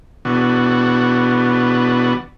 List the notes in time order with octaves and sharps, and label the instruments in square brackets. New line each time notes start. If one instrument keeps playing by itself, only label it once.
[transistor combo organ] B2 E3 B3 D4 F#4